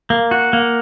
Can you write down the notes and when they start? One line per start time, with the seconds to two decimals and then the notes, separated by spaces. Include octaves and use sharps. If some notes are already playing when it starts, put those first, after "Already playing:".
0.10 A#3
0.31 F#4
0.53 A#3